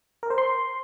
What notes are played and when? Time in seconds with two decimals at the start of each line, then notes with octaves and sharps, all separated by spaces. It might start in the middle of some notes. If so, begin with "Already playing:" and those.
0.23 A#4
0.30 C5
0.38 C6